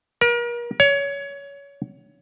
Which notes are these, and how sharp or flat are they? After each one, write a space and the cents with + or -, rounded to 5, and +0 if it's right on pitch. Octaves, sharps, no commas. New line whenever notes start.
A#4 +35
C#5 +25